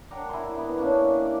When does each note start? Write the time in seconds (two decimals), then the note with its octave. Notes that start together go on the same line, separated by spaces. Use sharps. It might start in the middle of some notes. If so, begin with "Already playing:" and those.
0.11 D4 A#4 F#5 G5
0.29 E4 G#5 C6
0.55 B3 E4
0.78 A#3 C#4 D4
1.25 D6